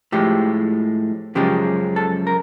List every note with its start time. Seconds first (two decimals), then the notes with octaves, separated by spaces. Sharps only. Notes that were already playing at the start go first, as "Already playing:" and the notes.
0.12 A2 F3 G#3 G4
1.35 F#2 C#3 F3 G#3 G4
1.96 A4
2.27 A#4